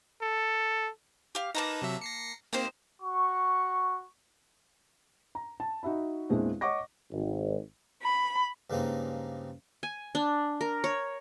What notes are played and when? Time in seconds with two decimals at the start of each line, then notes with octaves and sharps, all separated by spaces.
0.22 A4
1.35 G4 F5
1.55 A#3 D#4 B4 A5 A#5
1.82 C3 F#3 E5
2.01 A#6 C7 C#7
2.53 A#3 C4 D#4 G4 C5
3.01 F#4 C#6
5.35 A#5
5.60 A5
5.83 D#4 F#4 E5 B5
6.29 E2 A#2 G#3 C4 D4 E4
6.61 C#5 D#5 F#5 C#6 D6 A#6
7.11 G#1
8.04 B5
8.70 G2 C#3 G#3 A#3 C4 D#4
9.83 G#5
10.15 D4
10.61 A#4
10.84 C#5